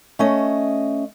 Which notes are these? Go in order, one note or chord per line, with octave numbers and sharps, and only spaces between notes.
A3 C#4 D#5